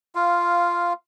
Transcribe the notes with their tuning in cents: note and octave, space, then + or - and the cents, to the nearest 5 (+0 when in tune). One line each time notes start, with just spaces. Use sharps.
F4 -5 F5 +0